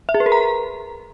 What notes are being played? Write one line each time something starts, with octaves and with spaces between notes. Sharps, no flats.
E5
G#4
B4
A#4
A#5